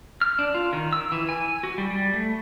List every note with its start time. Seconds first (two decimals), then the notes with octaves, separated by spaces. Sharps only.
0.21 F6
0.39 D4
0.54 F4
0.73 D#3
0.93 E6
1.12 E3
1.29 G#5
1.63 F#4
1.78 G3
1.90 G3
2.13 A3